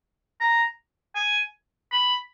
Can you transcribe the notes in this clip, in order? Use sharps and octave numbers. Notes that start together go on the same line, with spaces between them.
A#5
G#5
B5